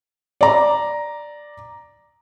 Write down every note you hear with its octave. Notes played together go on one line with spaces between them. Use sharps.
D5 A#5